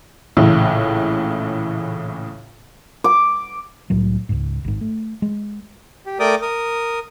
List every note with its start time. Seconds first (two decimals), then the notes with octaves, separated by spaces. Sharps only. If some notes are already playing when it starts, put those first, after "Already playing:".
0.37 A#1 A2 C#3 E3
3.04 D6
3.90 C2 A2 F#3
4.29 C#2 G#2
4.65 G#1 G#2
4.81 A3
5.22 G#3
6.06 G4
6.19 A3 A#4 D5 G5 D6 D#6
6.42 A#4 D#6